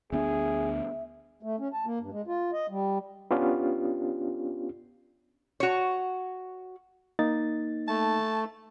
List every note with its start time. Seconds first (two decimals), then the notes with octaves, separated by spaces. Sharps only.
0.12 D2 B3 D4 G#4 E5
1.43 A3
1.59 C#4
1.73 A5
1.86 A#3
2.00 G2
2.12 G#3
2.27 F4
2.53 D#5
2.70 G3
3.31 B3 C#4 D4 F4 G4
5.60 F#4 C#5
7.19 A#3 D#4 A6
7.88 A3 A5